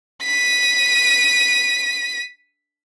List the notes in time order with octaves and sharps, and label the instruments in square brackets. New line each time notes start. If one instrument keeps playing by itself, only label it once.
[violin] B6 D#7